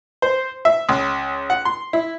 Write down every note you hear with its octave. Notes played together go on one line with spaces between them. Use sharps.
C5
E5
C#2
F#5
C6
E4